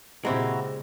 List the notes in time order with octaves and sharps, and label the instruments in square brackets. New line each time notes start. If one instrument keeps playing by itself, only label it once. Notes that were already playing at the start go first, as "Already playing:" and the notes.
[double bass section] A#2 C#3 [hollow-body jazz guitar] G#3 C4 G4 [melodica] E4 F#4 A#5